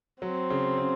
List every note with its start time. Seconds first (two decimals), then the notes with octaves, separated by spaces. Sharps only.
0.22 F#3 C4
0.50 C#3
0.78 C#3